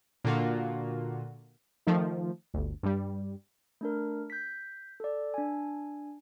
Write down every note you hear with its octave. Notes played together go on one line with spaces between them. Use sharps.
A#2 D3 F4 F#4
D#3 F3 A3
G1 D2
G2 G3
A3 D4 A#4
G6 B6
A4 D5
D4 G#5